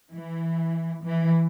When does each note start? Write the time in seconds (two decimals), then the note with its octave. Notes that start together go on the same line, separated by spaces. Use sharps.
0.12 E3
1.03 E3